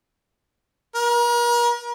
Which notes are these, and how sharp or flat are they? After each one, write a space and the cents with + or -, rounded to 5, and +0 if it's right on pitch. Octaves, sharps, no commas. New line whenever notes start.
A#4 +40